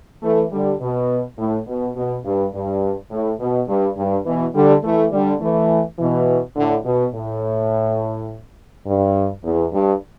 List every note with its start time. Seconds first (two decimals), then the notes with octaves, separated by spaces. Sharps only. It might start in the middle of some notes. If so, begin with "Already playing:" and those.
0.23 E3 A3
0.52 D3 G3
0.81 B2
1.39 A2
1.67 B2
1.96 B2
2.25 G2
2.54 G2
3.11 A2
3.40 B2
3.68 G2
3.97 G2
4.26 B2 E3
4.55 D3 G3
4.84 E3 A3
5.12 D3 G3
5.41 E3 A3
5.99 B2 E3
6.56 A2 D3
6.85 B2
7.15 A2
8.87 G2
9.44 E2
9.73 G2